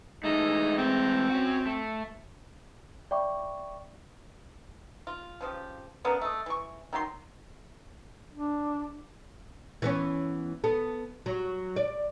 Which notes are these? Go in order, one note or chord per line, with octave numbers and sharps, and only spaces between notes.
E3 G#3 A3 D#4
C4
C#4 F#4
A3
D5 E5 G5 B5 C#6 D6
F4
C#3 F3 D4 G4
C#3 A#3 B3 D4
A3 D#5
E3 C#6
D#3 F#3 F4 C6
D4
E3 B3 C#4
B3 A4
F#3
D5